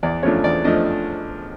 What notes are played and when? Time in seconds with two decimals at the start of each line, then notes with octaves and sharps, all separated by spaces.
0.03 E2 D5
0.23 C#3 F3 A3 D4 C#5
0.44 E2 D5
0.64 F3 A3 D4 D#5